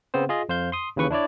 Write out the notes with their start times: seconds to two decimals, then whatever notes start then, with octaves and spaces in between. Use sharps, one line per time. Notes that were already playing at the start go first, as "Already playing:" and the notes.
0.14 C#3 B3 C4 C5
0.29 F4 G#4 D#5
0.49 F2 C5 F5 G6
0.72 C6 D#6
0.96 D#2 C#3 E3 B4 C#6
1.10 D4 E4 C#5 D5